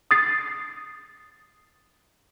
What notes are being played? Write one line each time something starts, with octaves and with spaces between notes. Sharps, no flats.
D#6 A6 C7